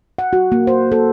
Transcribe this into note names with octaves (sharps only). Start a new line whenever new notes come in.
F#5
F#4
A#3
C5
A4